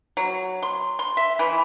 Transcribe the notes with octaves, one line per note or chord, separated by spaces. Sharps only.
F#3
C6
C6
E5
E3